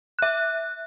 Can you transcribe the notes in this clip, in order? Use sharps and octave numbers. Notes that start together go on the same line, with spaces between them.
E5 F#6